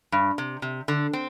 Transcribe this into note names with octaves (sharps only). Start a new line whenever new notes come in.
G2
C3
C3
D3
C4